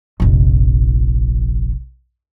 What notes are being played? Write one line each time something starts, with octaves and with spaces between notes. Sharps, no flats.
F1 A#1